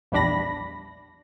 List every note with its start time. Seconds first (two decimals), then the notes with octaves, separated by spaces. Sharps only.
0.12 A#1 E2 G3 D4 B5 A#6